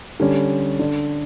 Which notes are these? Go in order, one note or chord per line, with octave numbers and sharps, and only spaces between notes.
D3 G3 C#4
D3